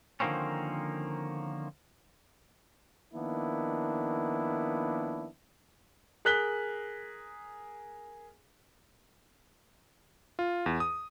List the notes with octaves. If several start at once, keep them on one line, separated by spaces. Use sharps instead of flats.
D3 D#3 F3 A#3 C4 C#4
D#3 F3 A#3 B3 D4 E4
G#4 A#4 F#6 B6 G7
F4
E2
D#6